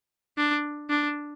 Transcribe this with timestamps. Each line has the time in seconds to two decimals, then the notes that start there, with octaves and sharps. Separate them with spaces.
0.38 D4
0.90 D4